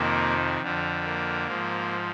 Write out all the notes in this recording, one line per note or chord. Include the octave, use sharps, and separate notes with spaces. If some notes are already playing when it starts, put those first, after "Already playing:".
Already playing: F2 C3 D#3 A#3
F2 D3 F3
A#3
G#2 F3